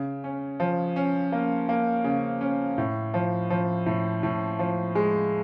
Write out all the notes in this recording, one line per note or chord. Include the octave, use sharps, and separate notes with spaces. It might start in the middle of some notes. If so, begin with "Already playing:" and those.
Already playing: C#3
C#4
F3
C#4
A#3
A#3
C#3
C#4
A2
F3
F3
A2
A2
F3
G#3